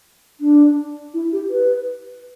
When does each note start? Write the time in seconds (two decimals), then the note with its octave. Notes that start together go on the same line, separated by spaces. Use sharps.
0.41 D4
1.14 E4
1.32 G4
1.50 B4